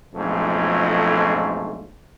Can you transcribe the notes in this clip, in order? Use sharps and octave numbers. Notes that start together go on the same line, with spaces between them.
B1 F2 G#2 D3 F3 A3